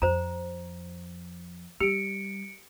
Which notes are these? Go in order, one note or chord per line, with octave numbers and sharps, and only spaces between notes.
F2 C5 A#5
G3 G4 C#7 D7